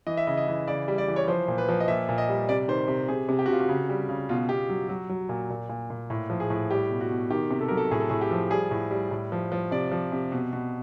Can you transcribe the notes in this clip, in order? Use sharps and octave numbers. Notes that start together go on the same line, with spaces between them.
E3 D#5
E5
C#3 D#5
D#5
E3
C#3 D5
G3
D5
E3
C#5
F3 C5
A#2
B4
F3
D#5
A#2 E5
A#2
D#5
G3
C3 D5
D#3 C5
C3
C3 G#4
C3
G4
F#4
C3 F4
F#4
C#3
G3
C#3
B2 F4
B2 G4
F#3
F#3
F#3
A#2
A#2
A#2
A#2
A2
F3
G#4
A2
G3 G4
B2
F#4
B2
D#3 G4
C3
A4
F#3 A#4
A4
A2 G#4
A4
A2 G#4
G4
F3
G3 G#4
A2
G3
A2
F3
F3
C3 D5
F3
C3
B2
B2